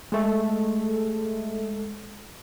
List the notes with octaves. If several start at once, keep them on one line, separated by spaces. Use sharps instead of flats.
G#3 A3 A4